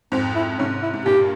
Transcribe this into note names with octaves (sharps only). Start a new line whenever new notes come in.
F2 G#2 C4
E4
G#2 C3 C#4
E4
G#2
G2 A#2 G4